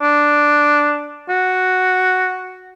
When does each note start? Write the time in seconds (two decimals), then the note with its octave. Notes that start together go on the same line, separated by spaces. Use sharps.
0.01 D4
1.29 F#4